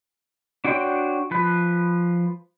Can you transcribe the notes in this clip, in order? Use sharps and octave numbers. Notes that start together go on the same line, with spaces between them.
D4 F#4 C#5 G5 C6
F3 B4